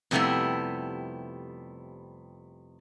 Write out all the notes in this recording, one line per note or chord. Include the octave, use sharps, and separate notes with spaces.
F2 C3 G3 A3 B3 E4